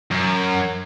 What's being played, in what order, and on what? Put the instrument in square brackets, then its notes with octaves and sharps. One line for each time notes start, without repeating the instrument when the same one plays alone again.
[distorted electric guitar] F#2